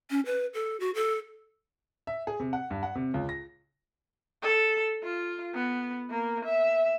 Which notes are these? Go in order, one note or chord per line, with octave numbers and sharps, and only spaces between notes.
C#4
B4
A4
F#4
A4
E5
G#4
C3
F#5
G2
F#5
C3
C#2
A#6
A4
F4
B3
A#3
E5